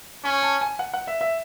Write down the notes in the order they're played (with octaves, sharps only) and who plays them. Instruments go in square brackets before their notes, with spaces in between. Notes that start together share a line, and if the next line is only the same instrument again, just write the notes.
[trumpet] C#4 [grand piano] C#6
[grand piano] A5
G#5
F#5
F#5
E5
E5